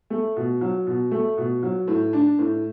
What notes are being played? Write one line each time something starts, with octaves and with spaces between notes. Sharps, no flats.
A3
B2
F#3
B2
A3
B2
F#3
A2
D4
A2